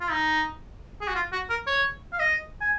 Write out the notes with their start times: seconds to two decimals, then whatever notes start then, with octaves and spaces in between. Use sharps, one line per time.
0.01 F4
0.11 D#4
1.01 G#4
1.08 F#4
1.15 F4
1.32 F#4
1.50 A#4
1.67 C#5
2.13 F5
2.19 D#5
2.61 G#5